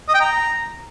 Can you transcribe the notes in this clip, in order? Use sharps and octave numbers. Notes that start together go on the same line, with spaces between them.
D#5
G5
A#5